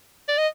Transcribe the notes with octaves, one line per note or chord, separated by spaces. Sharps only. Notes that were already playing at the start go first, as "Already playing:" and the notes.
D5
D#5